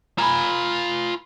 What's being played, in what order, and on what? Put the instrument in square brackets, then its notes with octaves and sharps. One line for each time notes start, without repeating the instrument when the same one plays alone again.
[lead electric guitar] F4 G#5 [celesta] A#5 B5